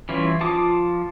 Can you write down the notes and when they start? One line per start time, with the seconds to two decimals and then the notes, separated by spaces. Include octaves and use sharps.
0.09 E3 G3 C#4 E4 F4
0.40 F3 F4 A5 D6 D#6